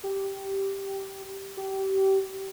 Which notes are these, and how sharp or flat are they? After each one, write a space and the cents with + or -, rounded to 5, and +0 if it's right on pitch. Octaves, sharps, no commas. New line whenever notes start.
G4 -5
G4 -25